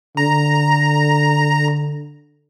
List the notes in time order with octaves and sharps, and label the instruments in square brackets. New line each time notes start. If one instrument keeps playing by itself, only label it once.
[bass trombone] D3 [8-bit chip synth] A#5